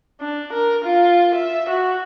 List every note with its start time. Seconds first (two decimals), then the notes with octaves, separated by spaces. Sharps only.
0.20 D4
0.53 A#4
0.85 F4
1.35 E5
1.69 F#4